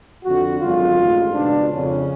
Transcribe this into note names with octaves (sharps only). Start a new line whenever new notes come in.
F2 D3 F#4
G#1 F#2 D3 F4
A1 G#2
C#2 B2 D4
F2 C#3 C#4